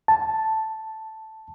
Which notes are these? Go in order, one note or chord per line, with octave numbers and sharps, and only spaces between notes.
A5